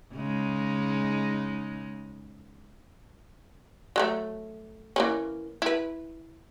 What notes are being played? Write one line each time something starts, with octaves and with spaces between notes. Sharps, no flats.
C#3 G#3 D#4
F#3 G#3 A3
E3 A#3 C#4
E4 B4